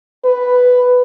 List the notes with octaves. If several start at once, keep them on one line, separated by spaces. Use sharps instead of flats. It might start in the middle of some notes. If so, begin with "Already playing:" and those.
B4